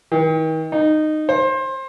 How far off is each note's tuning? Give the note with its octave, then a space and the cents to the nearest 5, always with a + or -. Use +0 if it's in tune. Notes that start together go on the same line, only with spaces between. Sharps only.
D#3 +40
D#4 -15
C5 +25